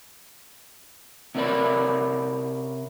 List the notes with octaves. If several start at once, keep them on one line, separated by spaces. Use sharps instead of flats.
C3 C#4 F4 A#4 D5 B5